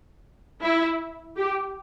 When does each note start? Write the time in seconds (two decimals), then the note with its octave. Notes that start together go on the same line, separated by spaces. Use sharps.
0.61 E4
1.37 G4